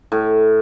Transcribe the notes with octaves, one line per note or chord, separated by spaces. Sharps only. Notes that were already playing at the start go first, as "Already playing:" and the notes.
A2